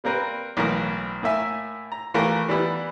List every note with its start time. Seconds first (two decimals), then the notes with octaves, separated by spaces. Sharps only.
0.04 G3 A#3 C4 A#4 B4
0.57 B1 A2 E3 A#3 A#4
1.23 A2 A#3 E5 G#5
1.92 A#5
2.14 E3 A3 A#3 F4 G4 A#4
2.48 E3 G3 B3 E4